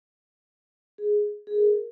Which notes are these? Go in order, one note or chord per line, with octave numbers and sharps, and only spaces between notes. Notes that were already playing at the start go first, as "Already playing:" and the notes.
G#4
G#4
A#4